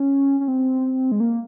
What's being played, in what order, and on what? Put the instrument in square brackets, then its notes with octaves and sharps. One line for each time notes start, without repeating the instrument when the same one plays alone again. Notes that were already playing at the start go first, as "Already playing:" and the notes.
Already playing: [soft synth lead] C#4
C#4
C4
G#3
A#3